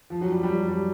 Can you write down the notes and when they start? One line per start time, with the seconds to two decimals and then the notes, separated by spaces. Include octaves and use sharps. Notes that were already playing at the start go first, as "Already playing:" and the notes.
0.10 F3
0.21 F#3
0.32 G3
0.43 G3
0.54 F#3
0.68 G3